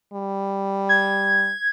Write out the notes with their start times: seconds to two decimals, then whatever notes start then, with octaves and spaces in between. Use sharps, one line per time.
0.13 G3
0.89 G#6